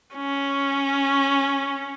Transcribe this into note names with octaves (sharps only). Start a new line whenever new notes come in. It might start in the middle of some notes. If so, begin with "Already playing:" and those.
C#4